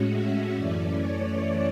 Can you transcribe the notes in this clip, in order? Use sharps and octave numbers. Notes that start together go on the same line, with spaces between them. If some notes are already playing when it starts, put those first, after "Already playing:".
Already playing: A2 G#3 C#4 F#4
E5
F#2 E3 A3 C#4 D5
C#5